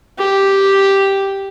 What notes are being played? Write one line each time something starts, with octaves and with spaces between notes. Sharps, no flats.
G4